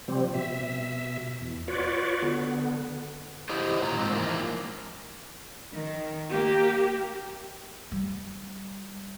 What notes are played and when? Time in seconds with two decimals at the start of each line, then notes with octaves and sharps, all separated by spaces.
0.08 C3 F3 G3 C4
0.34 B2 E5
1.41 E2
1.68 F4 F#4 B4 C#5 D5
2.22 D3 B3
3.49 E4 G4 C5 D#5
3.82 A#2 D#3 A#3 A#5
3.97 G#2 C4 D#4
4.13 E3 F3 A#3
5.72 D#3
6.30 A#3 G4
7.92 G3